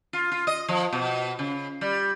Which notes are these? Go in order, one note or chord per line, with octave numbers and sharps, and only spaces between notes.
F4
F4
D#5
F3
B2
C#3
G3